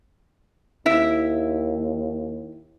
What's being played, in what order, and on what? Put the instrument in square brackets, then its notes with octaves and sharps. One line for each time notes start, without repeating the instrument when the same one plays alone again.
[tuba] D#2 [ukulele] E4 E5